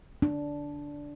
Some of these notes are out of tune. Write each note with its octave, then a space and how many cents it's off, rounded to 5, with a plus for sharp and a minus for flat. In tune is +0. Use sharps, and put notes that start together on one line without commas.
D4 -10